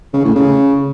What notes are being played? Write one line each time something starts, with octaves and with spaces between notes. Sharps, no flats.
C#3
A2
C#3